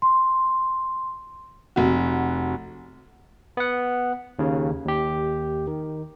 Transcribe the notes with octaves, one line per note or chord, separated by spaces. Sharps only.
C6
F1 F#4
B3 F#5
D#2 C#3
D#2 G4
D#3